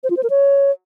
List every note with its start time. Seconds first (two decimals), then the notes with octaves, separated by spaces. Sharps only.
0.04 C5
0.10 F4
0.17 C5
0.23 A#4
0.30 C#5